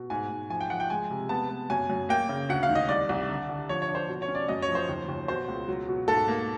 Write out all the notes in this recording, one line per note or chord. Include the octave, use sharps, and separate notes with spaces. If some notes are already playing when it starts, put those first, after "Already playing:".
Already playing: B2
G#2 G#5
G#2
F3 G#5
G5
F3 F#5
G5
G#3 G#5
C3
B3 A5
B3
F#2 G#5
F#2
A#3 G5
C#3
D2 F#5
F5
D#3
D#5
C2 D5
C2
D3
D3
F3 C#5
C#5
D4
C5
B2
C#5
C#4
D5
F#2 D#5
C#5
F3
C5
D#2
D#2
B2 C5
C#2
F#3
B2
G#2 A4
A#3